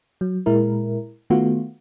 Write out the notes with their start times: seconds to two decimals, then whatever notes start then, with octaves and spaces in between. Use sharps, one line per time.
0.21 F#3
0.46 A#2 G#3 E4 A#4
1.30 D#3 A3 B3 F4 F#4